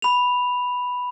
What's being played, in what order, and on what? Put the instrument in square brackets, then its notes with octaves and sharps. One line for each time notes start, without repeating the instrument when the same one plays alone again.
[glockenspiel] B5 F7